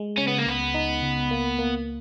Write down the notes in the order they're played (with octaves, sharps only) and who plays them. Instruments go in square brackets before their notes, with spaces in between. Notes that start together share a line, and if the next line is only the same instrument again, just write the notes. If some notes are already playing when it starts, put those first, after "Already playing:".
Already playing: [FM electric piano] G#3
[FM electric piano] C#3 [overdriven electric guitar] C#4
[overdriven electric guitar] B3
A#3
[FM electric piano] C#2 [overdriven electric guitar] B3
[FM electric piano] D#4
C#2
A#3
A#3